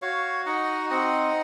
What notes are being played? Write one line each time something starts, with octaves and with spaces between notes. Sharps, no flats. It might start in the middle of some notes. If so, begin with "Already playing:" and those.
F#4 C#5 F5
D#4 D#5 F#5
C4 D#5 F#5